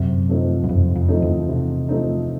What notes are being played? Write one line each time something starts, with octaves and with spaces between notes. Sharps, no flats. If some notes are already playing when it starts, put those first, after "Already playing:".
Already playing: F#2 C3
F3 A3 C4 D#4
F#2
F2 C3
F2
F3 A3 C4 D#4
E2
C3
F3 A3 C4 D#4